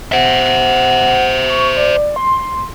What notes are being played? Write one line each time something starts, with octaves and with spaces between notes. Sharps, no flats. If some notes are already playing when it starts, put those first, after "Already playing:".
C5 E5 F#5
C#6
D5
C6